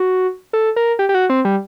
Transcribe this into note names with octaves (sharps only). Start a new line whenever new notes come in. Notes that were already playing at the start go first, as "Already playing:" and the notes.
Already playing: F#4
A4
A#4
G4
G4
F#4
C4
G3